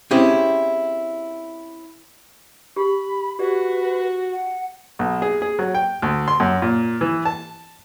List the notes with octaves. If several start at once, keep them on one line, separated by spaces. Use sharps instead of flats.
C4 C#4 E4 G4 G#4 C5
G4 G#4 B5
F#4 G4 B4 D5
F#5
B1
G#4
G#4
F#3
G5
D2
C6
F#2
A#2
E3
A5